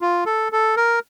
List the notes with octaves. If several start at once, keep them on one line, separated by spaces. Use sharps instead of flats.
F4
A4
A4
A#4